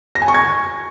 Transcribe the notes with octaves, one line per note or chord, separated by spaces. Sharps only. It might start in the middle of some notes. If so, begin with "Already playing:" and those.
A#6
G#5
C#6
G#6